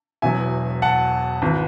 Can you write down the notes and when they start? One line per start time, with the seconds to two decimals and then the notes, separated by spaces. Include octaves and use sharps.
0.22 E1 E2 B2 F#3 E5 G#5
0.82 F#5 A5
1.42 G#1 E3